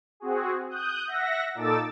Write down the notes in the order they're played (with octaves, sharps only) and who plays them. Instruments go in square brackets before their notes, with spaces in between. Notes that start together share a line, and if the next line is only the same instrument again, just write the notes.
[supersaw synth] C4 F#4 G#4
D#6 F#6 G6
E5 F#5 A#6
A#2 D#4 A4 D6 E6 A6